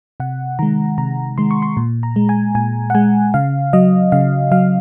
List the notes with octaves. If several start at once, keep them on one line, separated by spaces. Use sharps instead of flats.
C3 F#5
D#3 G#3 A#5
C3 A#5
D#3 G#3 C6
C#6
C6
A#2
A#5
G#3
G#5
A#2 G#5
F#5
G#3 G#5
C#3 F5
F#3 D#5
C#3 F5
F#3 F5